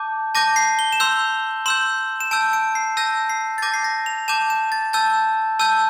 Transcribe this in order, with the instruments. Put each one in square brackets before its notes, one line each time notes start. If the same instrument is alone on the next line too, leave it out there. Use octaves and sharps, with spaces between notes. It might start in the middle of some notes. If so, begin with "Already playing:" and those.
Already playing: [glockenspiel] A5 D6 G6
A5 D6 G6 A#6
C7
G7
E7
C6 E6 G6 F7
C6 E6 G6 E7
E7
A5 E6 G6 D7
D7
C7
A5 E6 G6 A#6
C7
A6
A5 D6 G6 A#6
C7
A#6
F7
A5 D6 G6 E7
E7
A6
A5 E6 G6 A6
A5 E6 G6